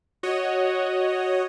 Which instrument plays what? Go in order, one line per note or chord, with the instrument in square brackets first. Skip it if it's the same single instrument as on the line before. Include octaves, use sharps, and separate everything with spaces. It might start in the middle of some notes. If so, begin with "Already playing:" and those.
[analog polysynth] F#4 C#5 D#5